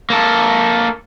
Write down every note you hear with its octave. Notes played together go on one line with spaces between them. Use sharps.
A#3 A4